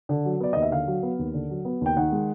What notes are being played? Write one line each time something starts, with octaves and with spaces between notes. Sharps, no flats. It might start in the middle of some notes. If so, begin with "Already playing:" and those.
D3
F#3
B3 D5
D#2 D#5
E5
D3 F5
F#3
B3
D#2
D3
F#3
B3
D#2 G5
D#3 F#5
G#3